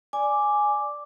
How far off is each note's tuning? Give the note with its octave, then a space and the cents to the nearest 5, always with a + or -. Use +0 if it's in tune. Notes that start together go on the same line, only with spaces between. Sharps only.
D5 +0 G#5 +0 D6 +0